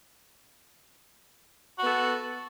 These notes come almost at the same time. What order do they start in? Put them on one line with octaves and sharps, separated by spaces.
F#4 B3 A4